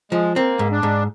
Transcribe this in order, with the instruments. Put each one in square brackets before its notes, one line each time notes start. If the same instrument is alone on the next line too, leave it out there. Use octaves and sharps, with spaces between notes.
[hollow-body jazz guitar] F3 [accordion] G#3
[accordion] A#3 [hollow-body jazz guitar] C4
[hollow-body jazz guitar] G#2
[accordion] D4
[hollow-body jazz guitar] G#2